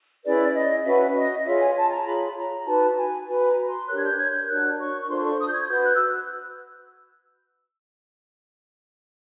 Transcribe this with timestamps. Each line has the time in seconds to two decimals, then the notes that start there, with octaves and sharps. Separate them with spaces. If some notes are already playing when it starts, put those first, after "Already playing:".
0.24 C#4 E4 G#4 B4 D5
0.54 D#5
0.85 C#4 F#4 B4 E5
1.15 D#5
1.45 F4 G#4 C#5 E5
1.61 G#5
1.76 A5
1.91 A#5
2.06 F4 G#4 C#5 B5
2.36 A#5
2.66 D#4 F#4 B4 A5
2.97 G#5
3.27 F#4 B4 G#5
3.47 A#5
3.68 C6
3.88 D4 G4 A#4 C#5 F#6
3.98 G#6
4.03 G6
4.18 G#6
4.33 G6
4.48 D4 F#4 A#4 C#5 F#6
4.78 C#6
5.03 C#6
5.08 D4 F4 A4 C5 C6
5.24 C#6
5.39 D#6
5.48 G6
5.54 G#6
5.69 F#4 B4 G6
5.84 F#6
5.93 E6